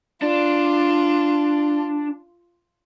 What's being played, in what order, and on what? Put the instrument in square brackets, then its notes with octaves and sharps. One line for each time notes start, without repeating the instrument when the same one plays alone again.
[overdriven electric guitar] D4 [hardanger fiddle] F4